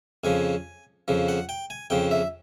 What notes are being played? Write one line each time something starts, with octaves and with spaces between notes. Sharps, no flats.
F2 C#3 F3 G#5
F2 C#3 F3
F#5
G5
G#5
F2 C#3 F3 G5
E5